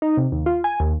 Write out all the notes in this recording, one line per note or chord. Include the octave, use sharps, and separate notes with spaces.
D#4
C3
D#2
F4
G#5
D#2